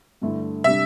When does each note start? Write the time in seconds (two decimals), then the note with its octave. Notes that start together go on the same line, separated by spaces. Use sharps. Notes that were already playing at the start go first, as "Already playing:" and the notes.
0.21 G2 D3 A3 E4
0.64 C3 G3 D4 E5